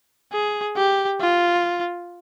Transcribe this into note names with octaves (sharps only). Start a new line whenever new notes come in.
G#4
G4
F4